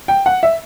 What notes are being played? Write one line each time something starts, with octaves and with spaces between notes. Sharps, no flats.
G5
F#5
E5